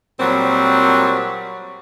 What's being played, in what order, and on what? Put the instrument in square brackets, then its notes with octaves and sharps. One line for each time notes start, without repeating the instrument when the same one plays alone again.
[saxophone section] A#2 F#3 G3 C4